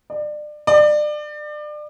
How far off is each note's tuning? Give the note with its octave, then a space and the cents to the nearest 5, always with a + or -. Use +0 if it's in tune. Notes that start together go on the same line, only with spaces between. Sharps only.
D5 +30
D5 +30